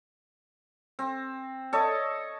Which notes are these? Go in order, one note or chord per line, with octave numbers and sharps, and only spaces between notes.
C4
A4 C#5 D#5